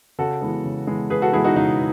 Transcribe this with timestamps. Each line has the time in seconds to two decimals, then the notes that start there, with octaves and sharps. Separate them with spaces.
0.19 C#3 F#4 A4
0.41 E3 G#3 B3
0.64 C#3
0.87 E3 G#3 B3
1.10 C#3 G#4 B4
1.22 F#4 A4
1.33 E3 G#3 B3 E4 G#4
1.44 D#4 F#4
1.56 C#3 D#4